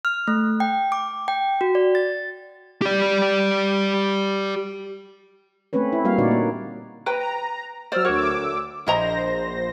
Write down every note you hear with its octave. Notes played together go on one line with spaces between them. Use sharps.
F6
A3
G5
D6
G5
F#4
D5
A6
G4 D5
A3 C4 C#4 B4 C#5
E4
G3 A#3 F#4 F5
A#2 D3 D#4 F#4 C#5 D5
A#3
B4 G5 A#5
F#3 C5 D5 E6 F6
D2 F#4 A#4 C#5 D6 E6
A#1 E4 C5 D#5 A#5 A#6